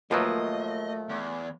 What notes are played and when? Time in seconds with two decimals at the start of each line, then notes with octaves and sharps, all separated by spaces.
0.11 D#2 F3 F#3 A3 A#3 F4 B4 D#5
1.09 E2